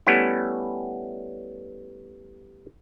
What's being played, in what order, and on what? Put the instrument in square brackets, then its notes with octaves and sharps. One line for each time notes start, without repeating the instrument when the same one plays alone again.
[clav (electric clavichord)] G3 A3 B3 C#4 E4